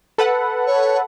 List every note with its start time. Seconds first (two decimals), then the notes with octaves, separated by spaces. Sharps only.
0.18 A4 B4 F#5
0.66 C#5